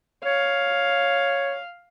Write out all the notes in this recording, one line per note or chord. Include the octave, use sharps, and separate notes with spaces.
C#5 F5